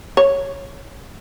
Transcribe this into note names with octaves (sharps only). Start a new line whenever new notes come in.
C#5